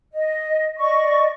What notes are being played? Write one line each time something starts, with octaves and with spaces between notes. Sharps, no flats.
D#5
D5 D#5 C#6